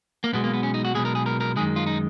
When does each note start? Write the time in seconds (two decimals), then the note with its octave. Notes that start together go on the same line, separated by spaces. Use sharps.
0.24 A#3
0.33 B1 B2 G#3 B3
0.44 A#3
0.54 B3
0.63 C#4
0.74 D#4
0.85 F#4
0.95 B1 B2 G#3 G#4
1.05 A#4
1.15 G#4
1.26 A#4
1.40 A#4
1.56 F#2 D#3 G#3 G#4
1.76 F4
1.87 D#4